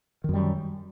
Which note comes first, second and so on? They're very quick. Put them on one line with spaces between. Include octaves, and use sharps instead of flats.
D#3 F#2 G3